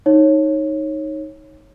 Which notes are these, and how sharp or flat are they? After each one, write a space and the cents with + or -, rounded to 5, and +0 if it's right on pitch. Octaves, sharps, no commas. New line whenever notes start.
D#4 +0 C#5 -20